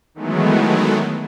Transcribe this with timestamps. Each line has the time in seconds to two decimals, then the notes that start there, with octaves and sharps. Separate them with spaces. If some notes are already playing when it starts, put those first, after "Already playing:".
0.14 D#3 E3 F#3 G#3 A3 B3